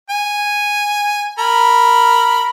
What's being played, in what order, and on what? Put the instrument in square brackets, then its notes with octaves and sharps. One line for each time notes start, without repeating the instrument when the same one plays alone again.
[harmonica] G#5
A#4 B5